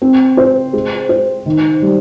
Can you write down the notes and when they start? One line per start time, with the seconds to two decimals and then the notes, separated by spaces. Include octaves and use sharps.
0.02 C4
0.37 C5
0.73 G#3
1.09 C5
1.46 D#3
1.82 G3